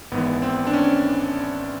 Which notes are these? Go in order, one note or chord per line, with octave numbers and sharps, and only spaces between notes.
G#1 G#2 E3 B3
C4
D4
C#4